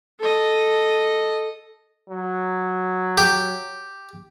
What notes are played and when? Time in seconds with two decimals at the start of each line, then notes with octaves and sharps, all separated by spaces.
0.20 A4 D#5
2.09 F#3
3.18 G4